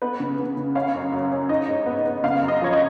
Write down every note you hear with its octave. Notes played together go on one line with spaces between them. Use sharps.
B3 B4
C#3
C#3
C#3
C#4 F5
F#2
F#2
C#4
D#4 D#5
G#2
B3
B3
C#3 F5
F#2
D#5
F3 C#5
D#5